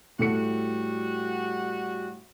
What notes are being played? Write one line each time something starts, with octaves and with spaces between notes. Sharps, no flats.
A2 G3 F#4 A4 C#7